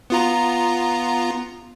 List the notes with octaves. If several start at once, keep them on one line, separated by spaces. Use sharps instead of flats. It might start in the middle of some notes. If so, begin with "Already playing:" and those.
B3 F4 A#5